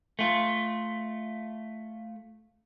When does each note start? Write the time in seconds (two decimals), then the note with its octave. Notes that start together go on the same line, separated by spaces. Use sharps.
0.19 A3 F4